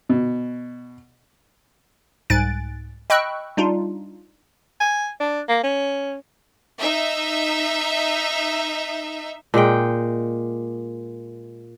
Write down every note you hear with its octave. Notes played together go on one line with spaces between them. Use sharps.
B2
C2 G#2 G#5 F#6 A6 D7
D#5 G5 B5 C#6 E6 F#6
G3 D4 D#4 F4
G#5
D4
A#3
C#4
D#4 E5
A#2 G#3 F#5 G5